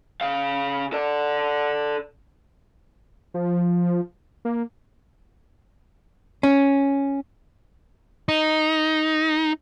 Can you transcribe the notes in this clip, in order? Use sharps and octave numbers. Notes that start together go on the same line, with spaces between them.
C#3 F5
A4 D5
F3
A#3
C#4
D#4